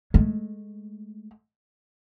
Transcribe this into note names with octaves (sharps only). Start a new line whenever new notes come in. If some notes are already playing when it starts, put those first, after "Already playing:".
G#3 A3